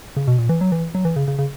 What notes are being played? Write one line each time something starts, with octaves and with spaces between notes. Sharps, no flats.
C#3
B2
A#2
E3
F#3
E3
F#3
E3
C#3
C#3
C#3